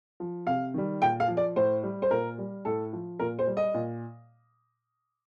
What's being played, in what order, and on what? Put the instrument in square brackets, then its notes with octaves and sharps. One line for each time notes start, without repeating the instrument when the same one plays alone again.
[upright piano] F3
C3 F5
D#3 G3
A#2 G5
F5
F3
D5
A2 C5
G3
C5
A#2 A#4
G3
A2 A4
F3
A#2 A#4
C5
G3
D#5
A#2